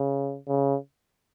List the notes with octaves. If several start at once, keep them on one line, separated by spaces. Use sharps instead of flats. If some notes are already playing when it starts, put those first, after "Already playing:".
Already playing: C#3
C#3